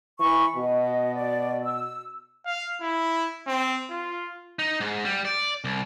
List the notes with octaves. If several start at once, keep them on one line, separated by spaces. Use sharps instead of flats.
E3 B5 C#6
B2 D#5
D5
E6
F5
E4
C4
F4
D#4
G#2
G3
D5
C2